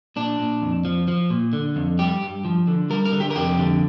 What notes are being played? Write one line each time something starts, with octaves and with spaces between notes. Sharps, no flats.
A#2 D4
A#2
F2
F3
F3
A#2
D3
F2
G3 G4
G2
F3
D3
G3 A#4
A#4
D3
G4
A#4
F2 G4
D3